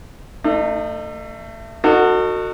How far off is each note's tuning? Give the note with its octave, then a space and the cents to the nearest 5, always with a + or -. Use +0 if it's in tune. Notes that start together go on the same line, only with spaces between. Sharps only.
A3 +30 D#4 -30
D#4 -25 F#4 -5 A4 +40